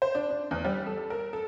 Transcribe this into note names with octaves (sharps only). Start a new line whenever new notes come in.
C5
D4
D4
E2
G3
A4
A#4
A4